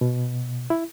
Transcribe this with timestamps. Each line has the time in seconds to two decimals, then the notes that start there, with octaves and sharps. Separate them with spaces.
0.01 B2
0.70 E4